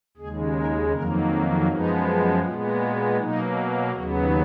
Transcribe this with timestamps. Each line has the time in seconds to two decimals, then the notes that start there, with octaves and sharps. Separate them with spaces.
0.17 D#2 C#3 G#3 G#4
0.55 A#4
0.92 F2 D#3 F#3 A#3 A#4
1.29 D#4
1.67 F#2 F3 G#3 B3 D#4
2.42 A#2 G#3 B3 F4
2.80 F#4
3.17 B2 F#3 A#3 D#4
3.92 D#2 C#3 F#3 B3 F#4